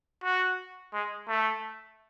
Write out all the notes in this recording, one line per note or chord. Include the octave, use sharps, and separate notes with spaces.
F#4
G#3
A3